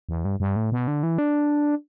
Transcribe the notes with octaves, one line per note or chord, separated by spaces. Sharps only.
E2
G2
G2
A2
B2
D3
E3
D4